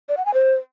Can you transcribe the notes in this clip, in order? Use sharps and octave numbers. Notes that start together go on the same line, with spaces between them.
D5
F#5
G#5
C5